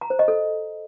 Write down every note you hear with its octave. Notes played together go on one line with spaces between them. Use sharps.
A#5
C5
D#5
A4